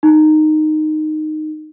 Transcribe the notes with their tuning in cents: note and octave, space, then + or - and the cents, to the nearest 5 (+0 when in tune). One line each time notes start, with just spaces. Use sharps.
D#4 -10